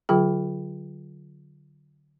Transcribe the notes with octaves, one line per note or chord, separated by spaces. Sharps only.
D3 F#3 F4 G#4 G5